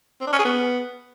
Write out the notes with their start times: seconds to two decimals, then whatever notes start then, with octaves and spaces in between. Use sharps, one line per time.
0.21 C4
0.27 D4
0.33 C#4
0.39 G#4
0.45 B3